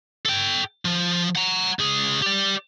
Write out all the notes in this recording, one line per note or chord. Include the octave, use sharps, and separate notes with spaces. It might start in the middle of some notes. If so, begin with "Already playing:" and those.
A4 G5
F3
F#5 A#5
C#2 G#4
G4 D5